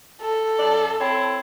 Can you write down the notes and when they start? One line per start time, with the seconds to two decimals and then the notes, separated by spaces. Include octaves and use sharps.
0.22 A4
0.58 F#2 D5
0.99 C4 E4 C#5